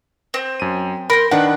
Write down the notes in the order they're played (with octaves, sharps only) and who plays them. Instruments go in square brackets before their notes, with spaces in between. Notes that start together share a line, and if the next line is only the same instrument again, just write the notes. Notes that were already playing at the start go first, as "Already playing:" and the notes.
[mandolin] C4
[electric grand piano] F#2 D#7
[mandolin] A#4 C5 [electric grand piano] B5
[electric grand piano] D#3 D4 F#5 [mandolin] B4